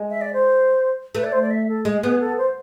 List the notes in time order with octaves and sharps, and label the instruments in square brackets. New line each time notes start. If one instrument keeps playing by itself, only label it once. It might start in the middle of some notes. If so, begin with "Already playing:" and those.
Already playing: [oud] G#3
[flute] E5
D5
C5
[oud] A3 [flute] B4
[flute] D5
C5
D5
E5
A4
[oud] G#3 [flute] G#4
[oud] B3 [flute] G#4
[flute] A4
C5